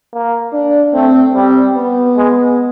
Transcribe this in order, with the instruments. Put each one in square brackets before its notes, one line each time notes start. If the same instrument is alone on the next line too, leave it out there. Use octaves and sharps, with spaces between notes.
[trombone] A#3
[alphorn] D4
[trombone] A3 [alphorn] C4
[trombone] G3 [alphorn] C4
[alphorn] B3
[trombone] G#3